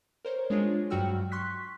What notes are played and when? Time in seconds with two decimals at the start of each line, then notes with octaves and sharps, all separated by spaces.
0.25 A#4 C5 C#5
0.50 G#3 D4 F4 C#5
0.90 G2 F#3 F#4 G5 E6 F6
1.32 C6 C#6 F#6 B6